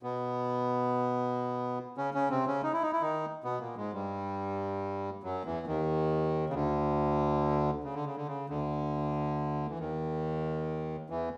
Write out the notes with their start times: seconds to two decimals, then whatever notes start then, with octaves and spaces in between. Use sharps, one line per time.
0.03 B2 B3
1.97 C#3 C#4
2.14 C#3 C#4
2.30 C3 C4
2.47 C#3 C#4
2.63 D#4
2.73 E4
2.82 D#4
2.92 E4
3.01 D#3 D#4
3.44 B2 B3
3.60 A#2 A#3
3.76 G#2 G#3
3.93 G2 G3
5.23 F#2 F#3
5.45 E2 E3
5.67 D#2 D#3
6.50 C#3
6.53 D2 D3
7.84 C#3
7.94 D3
8.05 C#3
8.16 D3
8.26 C#3
8.49 D2 D3
9.69 E3
9.79 D#2 D#3
11.10 E2 E3